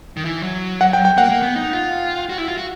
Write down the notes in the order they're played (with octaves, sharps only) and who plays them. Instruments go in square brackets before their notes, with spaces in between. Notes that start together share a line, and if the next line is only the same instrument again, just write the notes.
[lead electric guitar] D#3
E3
F#3
[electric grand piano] F#5
G5
G5
[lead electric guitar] A#3 [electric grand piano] F#5
[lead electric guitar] A#3
B3
D#4
F4
F#4
E4
F4
F#4